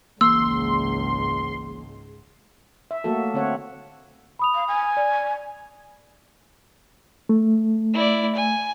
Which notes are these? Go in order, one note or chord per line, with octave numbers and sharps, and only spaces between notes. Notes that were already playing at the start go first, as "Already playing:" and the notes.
G#1 C#2 G#2 E3 A#3 C6 E6
E5
F#3 A3 A#3 F#4 A4
D3 C4 C#5 F#5
B5 D#6 F7
F5
G#5
D5
A3
E4 D5
G#5